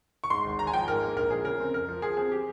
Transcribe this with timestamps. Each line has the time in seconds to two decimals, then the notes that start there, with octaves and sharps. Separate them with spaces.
0.24 C#6
0.30 G#2 C6
0.45 G#1
0.59 G#1 A#5
0.67 G#5
0.74 F3 G5
0.88 G#2 A#4
1.02 A#3
1.16 A#1 A#4
1.31 F3 G#4
1.45 C#3 A#4
1.60 C4
1.74 F2 A#4
1.89 F3
2.02 F3 G#4
2.17 C4 G#4
2.32 G4